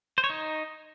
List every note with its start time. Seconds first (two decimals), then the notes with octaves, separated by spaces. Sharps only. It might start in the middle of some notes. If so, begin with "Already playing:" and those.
0.18 C5
0.24 C#5
0.30 D#4